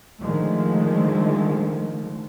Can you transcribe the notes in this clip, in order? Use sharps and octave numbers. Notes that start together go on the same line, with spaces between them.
D3 D#3 F3 G#3 A3